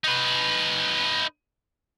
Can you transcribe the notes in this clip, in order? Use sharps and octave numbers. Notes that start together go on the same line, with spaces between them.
D#4 B4